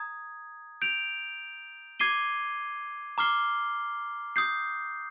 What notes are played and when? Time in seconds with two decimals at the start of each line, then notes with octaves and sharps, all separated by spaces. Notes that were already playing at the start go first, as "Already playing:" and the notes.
Already playing: A#5 D#6 G#6
0.82 G6 D7 F7
1.99 D6 G#6 C7 D#7 G7
3.18 A#5 D6 F6 C7 G7
4.36 D#6 G6 C7